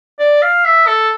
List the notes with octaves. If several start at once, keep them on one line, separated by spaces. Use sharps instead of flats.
D5
F5
E5
A4